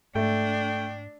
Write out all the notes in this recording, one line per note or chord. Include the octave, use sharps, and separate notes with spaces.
G#2 A3 D4 G5